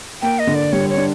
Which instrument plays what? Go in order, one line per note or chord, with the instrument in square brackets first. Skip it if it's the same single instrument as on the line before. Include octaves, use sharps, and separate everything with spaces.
[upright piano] A#3 [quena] G5
[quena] D#5
[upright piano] D3
[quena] D5
[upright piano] G3 [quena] C#5
[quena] C#5
[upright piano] D4